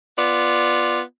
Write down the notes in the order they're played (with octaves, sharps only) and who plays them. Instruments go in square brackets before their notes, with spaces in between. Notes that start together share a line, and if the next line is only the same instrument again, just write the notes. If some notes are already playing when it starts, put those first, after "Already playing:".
[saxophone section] B3 F4 D5